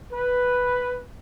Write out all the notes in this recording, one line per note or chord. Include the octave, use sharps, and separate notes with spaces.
B4